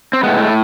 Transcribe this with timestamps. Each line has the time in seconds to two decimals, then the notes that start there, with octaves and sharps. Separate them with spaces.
0.13 C4
0.23 A2 G#3 B3
0.38 A3